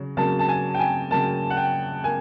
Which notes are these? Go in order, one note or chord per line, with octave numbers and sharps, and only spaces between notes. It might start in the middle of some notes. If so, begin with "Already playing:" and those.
Already playing: C#3 F#3
C#3 F#3 A#3 A5
A5
G#5
G5
G#5
C#3 F#3 A#3 A5
F#5
G5
A#3 G#5